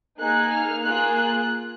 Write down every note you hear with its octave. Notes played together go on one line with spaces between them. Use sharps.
A#3 D#4 G#4 F#6
F6
A#3 F4 G#4 F#6
F#6